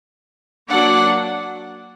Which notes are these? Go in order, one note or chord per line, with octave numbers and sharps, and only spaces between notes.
F#3 A#3 D4 D5 F#5